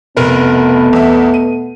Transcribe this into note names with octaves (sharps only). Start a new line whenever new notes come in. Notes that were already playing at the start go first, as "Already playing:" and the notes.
F1 B2 A3 B3 A#4 B4
E2 E5
D#7